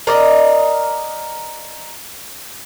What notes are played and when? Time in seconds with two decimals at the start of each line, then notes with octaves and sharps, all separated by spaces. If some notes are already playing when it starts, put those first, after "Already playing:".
0.07 A#4 D5 D#5